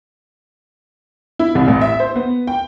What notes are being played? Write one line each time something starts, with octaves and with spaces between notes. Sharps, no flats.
E4
C2
A1
E5
C5
B3
G5